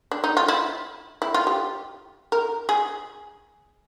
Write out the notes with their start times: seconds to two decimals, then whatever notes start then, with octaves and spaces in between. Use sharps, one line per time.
0.11 D4
0.24 D#4
0.37 F4
0.48 E4
1.22 E4
1.34 F4
1.47 G4
2.32 A#4
2.69 G#4